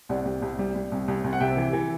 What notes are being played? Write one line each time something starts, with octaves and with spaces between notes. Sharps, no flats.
C2 D5 F#5
G3
C2
G3
G3
C2
C2
C2
F#5
C3 E5 G5
E3
E3